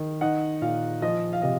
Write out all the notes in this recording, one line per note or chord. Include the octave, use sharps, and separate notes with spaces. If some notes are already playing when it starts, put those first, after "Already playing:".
Already playing: D#3
D#4 F#5
A#2 F5
F3 D#5
F5
C3 D#5